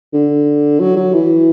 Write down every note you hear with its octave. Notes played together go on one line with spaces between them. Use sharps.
D3
F#3
F#3
E3